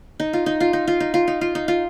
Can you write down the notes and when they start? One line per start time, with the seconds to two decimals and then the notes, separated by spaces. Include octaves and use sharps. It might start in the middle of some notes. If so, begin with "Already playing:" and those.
0.20 D#4
0.33 F4
0.46 D#4
0.60 F4
0.73 D#4
0.88 F4
1.00 D#4
1.14 F4
1.28 D#4
1.41 F4
1.55 D#4
1.68 F4